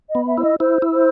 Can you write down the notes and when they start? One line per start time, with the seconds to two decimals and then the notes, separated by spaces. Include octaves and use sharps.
0.09 D#5
0.15 B3
0.27 E5
0.38 E4 C5
0.43 D#5
0.60 E4 C5
0.82 E4
0.93 C5